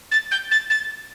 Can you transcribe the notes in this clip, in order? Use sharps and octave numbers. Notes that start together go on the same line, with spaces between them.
A6
G6
A6
A6